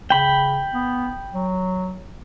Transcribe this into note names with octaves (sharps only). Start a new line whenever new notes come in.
C#3 G5 B5
B3
F#3